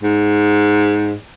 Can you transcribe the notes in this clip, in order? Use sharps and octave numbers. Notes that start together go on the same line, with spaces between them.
G#2